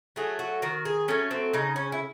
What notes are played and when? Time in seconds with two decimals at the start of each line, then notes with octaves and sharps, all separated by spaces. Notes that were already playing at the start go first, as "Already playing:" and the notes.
0.16 F#3 A3 G#4
0.39 F#4
0.62 D#3 F#4
0.85 G#4
1.08 F#3 A3 C#4
1.31 C4
1.53 C#3 D#4
1.76 C#4
1.92 E4